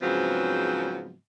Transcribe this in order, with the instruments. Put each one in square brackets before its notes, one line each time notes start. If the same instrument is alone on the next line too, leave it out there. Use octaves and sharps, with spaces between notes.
[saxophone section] G#2 C#3 F3 F#3 B3 C4